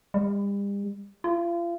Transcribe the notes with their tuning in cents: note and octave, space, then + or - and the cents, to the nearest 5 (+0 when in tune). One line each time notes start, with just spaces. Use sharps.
G3 +40
F4 -35